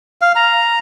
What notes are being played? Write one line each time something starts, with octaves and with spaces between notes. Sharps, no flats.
F5
A#5